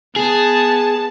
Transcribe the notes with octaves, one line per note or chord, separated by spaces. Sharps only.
B3 G#4 A5